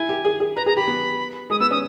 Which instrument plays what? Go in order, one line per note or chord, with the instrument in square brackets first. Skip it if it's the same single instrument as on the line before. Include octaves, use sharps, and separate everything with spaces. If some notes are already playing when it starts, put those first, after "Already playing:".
Already playing: [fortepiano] E4 [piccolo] G#5
[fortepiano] G4
G#4
G#4
[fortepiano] B4 [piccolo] A#5
[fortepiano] G#4 [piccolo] A#5
[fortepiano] G4 [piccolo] B5
[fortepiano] B3
[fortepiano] G#3 [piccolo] D#6
[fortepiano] B3 [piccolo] E6
[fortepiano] C#4 [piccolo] D#6